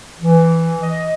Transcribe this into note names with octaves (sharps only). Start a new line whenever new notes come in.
E3
D#5